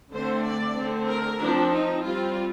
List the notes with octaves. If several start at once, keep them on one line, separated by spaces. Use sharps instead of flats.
D3 A3 C4 C5
D5
D3 A3 C4
A#4
F3 C4 D4
D#4
G3 C4 F4